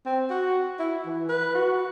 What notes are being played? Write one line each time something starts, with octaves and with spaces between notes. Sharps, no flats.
C4
F#4
E4
E3
B4
F#4